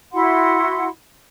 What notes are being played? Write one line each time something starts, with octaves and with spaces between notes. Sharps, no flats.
E4 F#4 F#5 C6